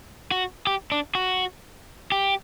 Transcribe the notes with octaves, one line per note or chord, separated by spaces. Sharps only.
F#4
G4
D4
F#4
G4